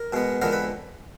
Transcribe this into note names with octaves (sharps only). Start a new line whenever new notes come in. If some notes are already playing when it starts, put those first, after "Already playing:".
Already playing: A#4
B2 G#3 B3
F2 D3 G#3 B3 A#4
B4